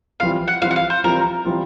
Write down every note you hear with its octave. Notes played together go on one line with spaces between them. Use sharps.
E3 G3 C4 F4 F5
F#5
E3 G3 C4 F4 F5
F#5
F5
C5
E3 G3 C4 F4 A#4
E3 G3 C4 F4